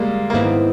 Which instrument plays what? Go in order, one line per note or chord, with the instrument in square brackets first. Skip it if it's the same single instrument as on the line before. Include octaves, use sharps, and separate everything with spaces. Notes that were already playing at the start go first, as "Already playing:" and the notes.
Already playing: [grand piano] G3 G#3 A#3
A#3
[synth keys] G#2 D#3 G#3 C4 E4 [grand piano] B3